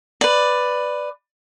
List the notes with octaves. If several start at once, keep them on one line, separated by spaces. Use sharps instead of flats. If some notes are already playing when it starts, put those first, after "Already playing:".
B4 D5